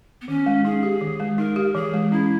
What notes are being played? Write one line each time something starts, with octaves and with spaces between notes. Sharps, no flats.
B3
D#3 C#4
G#3
D#4 G#4
G4
D#3
G#3
D#4 A#4
G4
E3 G#4
G#3
C#4 E4